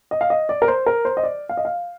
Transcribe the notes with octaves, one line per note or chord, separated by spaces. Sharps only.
D#5
F5
D#5
D5
A#4
C5
A#4
C5
D#5
D5
F5
D#5
F5